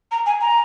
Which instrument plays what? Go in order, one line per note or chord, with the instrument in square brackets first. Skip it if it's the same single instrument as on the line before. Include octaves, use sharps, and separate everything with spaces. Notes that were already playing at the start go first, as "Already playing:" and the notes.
[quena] A#5
G#5
A#5